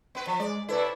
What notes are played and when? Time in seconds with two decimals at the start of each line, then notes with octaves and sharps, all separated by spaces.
0.15 B3 B4
0.27 F3
0.40 G#3 D5
0.69 C3 E4 A4 B4 D5